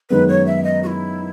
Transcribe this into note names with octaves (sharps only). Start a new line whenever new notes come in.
F#2 D#3 G#3 B3 B4
C#5
E5
D#5
F#4
E4